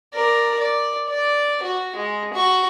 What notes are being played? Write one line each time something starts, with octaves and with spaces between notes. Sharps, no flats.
A#4 D5
D5
D5
F#4
G#3
F#4 C#6